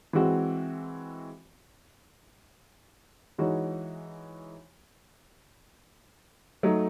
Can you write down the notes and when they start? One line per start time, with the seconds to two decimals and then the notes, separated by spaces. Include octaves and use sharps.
0.13 E3 G#3 C4 F#4
3.38 E3 G#3 D#4 F#4 C#5
6.63 F#3 A3 D#4